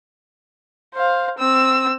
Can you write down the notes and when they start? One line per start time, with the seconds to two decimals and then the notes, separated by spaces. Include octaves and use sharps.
0.95 C5 F5
1.39 C4 E6